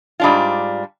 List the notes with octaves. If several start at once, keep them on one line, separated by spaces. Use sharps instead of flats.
G#2 G3 D4 F4